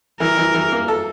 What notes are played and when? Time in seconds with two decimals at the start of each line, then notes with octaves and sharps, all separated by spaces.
0.20 E3 A#4
0.37 E3
0.55 E3
0.72 A#3
0.88 A4